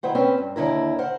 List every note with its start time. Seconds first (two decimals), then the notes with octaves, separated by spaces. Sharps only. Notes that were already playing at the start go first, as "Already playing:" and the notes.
0.03 D#3 E4 C5 F#5
0.15 C4 C#4 B4
0.38 G2
0.56 D#2 D3 E4 A#4
0.99 A#4 C5 F#5